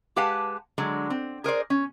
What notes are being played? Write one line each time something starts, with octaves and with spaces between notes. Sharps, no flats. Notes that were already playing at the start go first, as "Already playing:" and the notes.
G#3 G4 B4 F5 F#5 A5
D3 F#3 G#3
C4
G#4 A#4 C5 D5
C#4